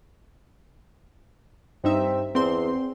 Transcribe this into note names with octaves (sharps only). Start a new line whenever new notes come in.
G2 C4 D#4 E5
E2 C4 C6